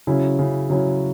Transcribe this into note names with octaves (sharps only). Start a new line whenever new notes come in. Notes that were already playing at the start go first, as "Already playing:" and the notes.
C#3 F#3 C#4 E4
C#3 F#3 C#4 E4
C#3 F#3 C#4 E4